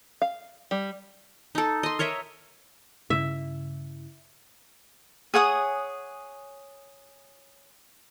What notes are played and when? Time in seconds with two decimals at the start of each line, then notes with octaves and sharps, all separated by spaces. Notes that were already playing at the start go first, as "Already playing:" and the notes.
0.22 F5
0.71 G3
1.55 D#4 A4
1.83 D#5 C6
1.99 A#4 C#5 D#5 E5
3.10 G2 C#3 E4 E5
5.34 G#4 C#5 F#5 D#6